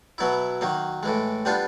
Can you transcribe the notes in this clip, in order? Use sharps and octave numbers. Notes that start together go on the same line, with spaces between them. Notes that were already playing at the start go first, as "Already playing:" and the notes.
B2 F#3 B3 E4
D#3 F#3 A#3
A2 E3 G#3
G3 B3 D4 F4